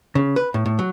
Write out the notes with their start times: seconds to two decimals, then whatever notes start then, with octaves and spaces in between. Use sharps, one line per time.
0.15 C#3
0.36 B4
0.54 A2
0.66 A2
0.79 F#3